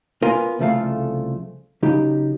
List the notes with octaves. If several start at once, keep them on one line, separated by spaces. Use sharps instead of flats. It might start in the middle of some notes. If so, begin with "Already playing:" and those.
B3 F4 A#4 F5 G#5 C6
C2 C#3 F3 A3 A4 F5
C#3 F#3 D#4 G4